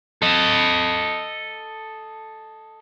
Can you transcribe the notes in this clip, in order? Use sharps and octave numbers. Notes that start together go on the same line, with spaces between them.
A4 D#5